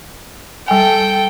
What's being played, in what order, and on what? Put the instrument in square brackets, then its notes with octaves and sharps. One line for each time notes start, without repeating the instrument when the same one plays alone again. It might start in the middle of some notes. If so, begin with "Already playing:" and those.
[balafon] G3 G#5 [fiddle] A4 G5